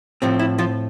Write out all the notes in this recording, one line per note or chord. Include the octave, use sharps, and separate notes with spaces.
A2 F3 C4
E4
F3 F4